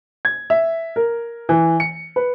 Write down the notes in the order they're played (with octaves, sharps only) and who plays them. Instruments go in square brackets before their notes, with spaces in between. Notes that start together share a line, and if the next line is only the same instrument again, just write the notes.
[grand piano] G#6
E5
A#4
E3
C#7
B4